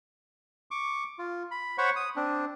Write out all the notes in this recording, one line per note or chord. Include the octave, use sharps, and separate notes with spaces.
C#6 D6
F4
B5
C5 C#5 F#5 B5 C#6
D#6
C4 D4